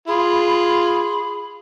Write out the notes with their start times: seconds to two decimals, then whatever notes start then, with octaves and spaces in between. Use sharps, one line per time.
0.08 F4 G#4 B5